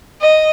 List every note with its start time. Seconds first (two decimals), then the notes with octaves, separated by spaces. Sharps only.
0.22 D#5